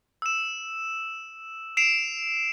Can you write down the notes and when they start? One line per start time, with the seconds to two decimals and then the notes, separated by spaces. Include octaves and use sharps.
0.22 E6 E7
1.77 C7 D7 E7 F7